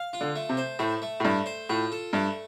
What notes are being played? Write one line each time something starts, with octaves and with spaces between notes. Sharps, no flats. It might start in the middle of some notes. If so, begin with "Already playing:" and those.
Already playing: F5
F4
D3
A3
C3
C5
A2 A3
A3
A2
G2 A3
C5
A2 F4
A4
G2 A3